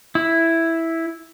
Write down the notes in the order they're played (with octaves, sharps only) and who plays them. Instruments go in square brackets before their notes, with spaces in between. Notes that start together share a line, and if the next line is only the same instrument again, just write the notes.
[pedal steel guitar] E4